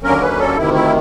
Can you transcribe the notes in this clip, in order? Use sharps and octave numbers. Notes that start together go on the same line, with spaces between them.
D#2 D3 F#3 A#3 C#4 A#4
B4
A4
D2 C3 D#3 E4
E4